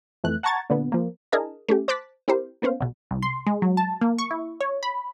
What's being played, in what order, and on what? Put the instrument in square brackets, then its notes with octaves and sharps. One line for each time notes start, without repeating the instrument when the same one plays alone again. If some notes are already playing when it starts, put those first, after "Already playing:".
[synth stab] F2 E3 A3 F#6
F#5 A5 A#5 C#6 G#6 A6
A#2 D3 B3
F3 A#3
[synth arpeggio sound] D4 E4 G#4 A#4 D#5 A5
A3 C#4 G4
C5 A5 D6 F#6 A6 B6
C4 E4 G4 A#4 C5
A#3 B3 C#4 C5 F5
B1 B2
[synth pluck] C2
C6
G#3
F#3
A5
A#3
C#6
E4
C#5
B5